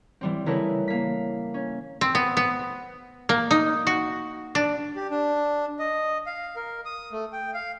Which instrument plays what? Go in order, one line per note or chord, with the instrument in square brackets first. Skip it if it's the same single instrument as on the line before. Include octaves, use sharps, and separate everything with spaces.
[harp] E3 G3 C4
C#3 E3 A3 E4 A#4 B4
A#3 B6
C#4
[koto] C4
B3
B3
A#3
D#4
F#4
D4
[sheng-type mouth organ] G4
D4
D#5
F5
A#4
D#6
A3
G5
F5